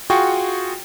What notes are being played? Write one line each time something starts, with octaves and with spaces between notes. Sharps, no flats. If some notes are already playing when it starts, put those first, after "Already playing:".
F4 F#4 G#4 G5 C#6